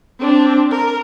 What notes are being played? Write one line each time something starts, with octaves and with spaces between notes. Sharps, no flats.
C4 D4
A#4